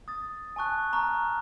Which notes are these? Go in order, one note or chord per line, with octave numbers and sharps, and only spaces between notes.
D#6 A6
G#5 A5 C#6 F#6
A#5 C#6 F6